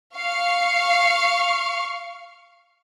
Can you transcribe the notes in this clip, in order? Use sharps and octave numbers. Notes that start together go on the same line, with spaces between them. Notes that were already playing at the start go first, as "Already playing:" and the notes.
F5 C#6